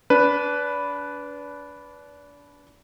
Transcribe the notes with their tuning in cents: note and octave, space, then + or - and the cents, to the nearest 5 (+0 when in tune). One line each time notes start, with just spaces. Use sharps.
D4 -30 B4 +0